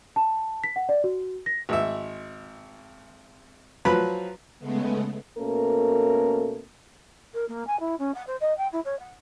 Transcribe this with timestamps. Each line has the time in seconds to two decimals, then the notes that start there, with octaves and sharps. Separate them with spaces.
0.16 A5
0.64 B6
0.76 F#5
0.89 D5
1.04 F#4
1.46 A#6
1.69 G#1 E5
3.85 F3 F#3 B4 B5
4.59 C#3 G#3 A3 B3
5.38 B2 A3 A#3 C#4 A4 A#4
7.33 A#4
7.48 A#3
7.67 G#5
7.79 E4
7.98 C#4
8.14 F#5
8.26 C5
8.41 D#5
8.57 G5
8.72 E4
8.84 C#5
8.99 F#5